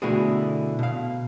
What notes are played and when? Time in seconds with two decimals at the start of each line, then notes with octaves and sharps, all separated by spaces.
0.02 B2 D3 A3 E4 F#4 G#4
0.79 B2 F5